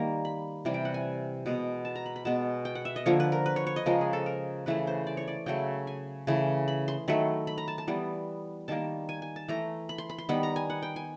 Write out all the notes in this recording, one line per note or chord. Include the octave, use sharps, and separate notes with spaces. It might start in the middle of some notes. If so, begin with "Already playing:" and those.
Already playing: D#3 G3 A#3 A#5
B5
C3 E3 G3
G5
F#5
G#5
B2 G#3 B3
A5
A#5
B5
B5
B2 G#3 B3 A5
G5
F#5
E5
D#5
D3 F3 A#3 C#5
B4
A#4
B4
C#5
C#5
D#5
C#3 F3 G#3 A#4
G#4
A4
A#4
C#3 E3 A3 B4
C5
D5
C#5
D5
C#3 F#3 A3 G5
G#5
C#3 E3 A3
B5
C6
D#3 F#3 A3 B5
B5
A#5
A5
A5
E3 G3 B3
D#3 G3 A#3 A5
G#5
G#5
A5
E3 A3 A#5
B5
C6
B5
C6
D#3 G3 B3 B5
A#5
G#5
F#5
G5
G#5